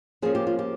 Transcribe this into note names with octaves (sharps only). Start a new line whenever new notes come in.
F3 A#3 C#4 G#4
G4
F4
G4